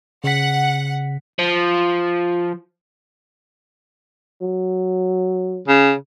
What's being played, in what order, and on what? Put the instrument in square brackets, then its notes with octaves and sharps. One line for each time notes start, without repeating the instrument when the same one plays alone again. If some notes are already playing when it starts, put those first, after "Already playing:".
[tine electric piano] C#3 B6 [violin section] F#5
[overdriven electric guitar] F3
[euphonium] F#3
[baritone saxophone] C#3